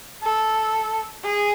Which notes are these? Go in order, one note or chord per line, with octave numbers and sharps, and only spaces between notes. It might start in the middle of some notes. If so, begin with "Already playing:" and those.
A4
G#4